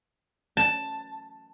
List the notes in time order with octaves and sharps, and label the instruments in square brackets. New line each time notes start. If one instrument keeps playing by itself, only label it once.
[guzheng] A5